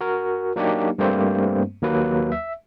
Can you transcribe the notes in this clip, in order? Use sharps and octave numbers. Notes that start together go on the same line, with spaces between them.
F#4 A#4
F#3 A#3 D4 D#4 F#4 G4
G2 G3 A3 A#3 C4 C5
D#2 F#3 A#3 B4
E5